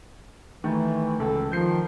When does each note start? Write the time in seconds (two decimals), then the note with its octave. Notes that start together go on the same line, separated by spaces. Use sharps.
0.64 D#3 E3 A3
1.20 C#2 A4
1.52 D#3 F3 G6 C7